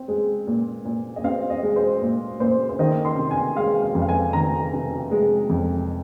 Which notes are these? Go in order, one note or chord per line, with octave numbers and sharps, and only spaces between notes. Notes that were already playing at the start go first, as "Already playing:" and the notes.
Already playing: C4
G#3
A#2
A#2
D#5
C4 F5
D#5
G#3
C5
A#2
A#2 C5
C5
D#3 D#5
C6
C3
G#5
G#3 F5
F5
F2
F5
G#5
D#3 A#5
C3
G#3
F2